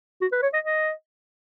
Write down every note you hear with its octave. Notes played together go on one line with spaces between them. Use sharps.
F#4
B4
C#5
D#5
D#5